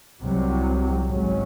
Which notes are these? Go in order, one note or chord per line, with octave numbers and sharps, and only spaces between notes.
C2 C3 F#3
G#1 G#2 F#3 C#4